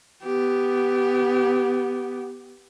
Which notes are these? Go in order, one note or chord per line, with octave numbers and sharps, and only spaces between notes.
B3 G4